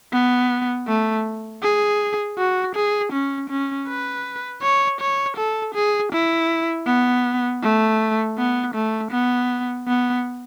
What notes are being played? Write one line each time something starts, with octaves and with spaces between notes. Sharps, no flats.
B3
A3
G#4
F#4
G#4
C#4
C#4
B4
C#5
C#5
A4
G#4
E4
B3
A3
B3
A3
B3
B3